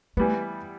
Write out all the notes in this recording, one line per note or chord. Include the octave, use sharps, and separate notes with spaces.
E3 G3 A3 B3